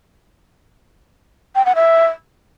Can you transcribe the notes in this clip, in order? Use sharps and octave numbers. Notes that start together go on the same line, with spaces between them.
G5
F#5
E5